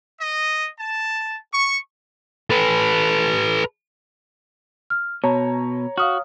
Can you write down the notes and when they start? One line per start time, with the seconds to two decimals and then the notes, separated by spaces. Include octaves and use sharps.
0.19 D#5
0.79 A5
1.53 C#6
2.50 A4 B4
4.90 F6
5.24 B2 C#5 A5 A#5
5.98 F#4 F5 D#6 F6